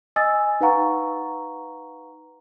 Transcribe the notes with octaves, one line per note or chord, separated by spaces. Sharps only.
D#5 G#5 D#6 E6 A6
D#4 B4 F5 F#5 A#5 C#6